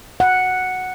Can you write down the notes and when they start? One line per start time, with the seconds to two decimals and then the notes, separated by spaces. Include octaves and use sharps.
0.20 F#5